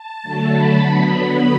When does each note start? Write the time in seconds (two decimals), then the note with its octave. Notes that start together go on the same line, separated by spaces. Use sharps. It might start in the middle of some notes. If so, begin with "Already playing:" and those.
Already playing: A5
0.23 D3 F#3 A3
0.52 B5
0.81 D3 F#3 B3